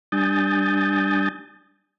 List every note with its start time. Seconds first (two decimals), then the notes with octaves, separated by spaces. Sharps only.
0.12 G3 D4 G#5 D#6 G6 A6